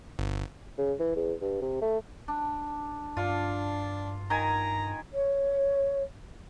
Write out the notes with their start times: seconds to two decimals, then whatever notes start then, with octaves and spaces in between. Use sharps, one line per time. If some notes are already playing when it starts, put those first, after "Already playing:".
0.19 G1
0.78 C#3
0.99 E3
1.16 E2
1.41 G2
1.61 C3
1.81 A3
2.28 D4
3.17 G2 D4 F4
4.30 D#3 G#5 A#5
5.13 C#5